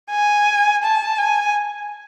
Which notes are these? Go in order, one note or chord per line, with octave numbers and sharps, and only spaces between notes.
G#5
A5
G#5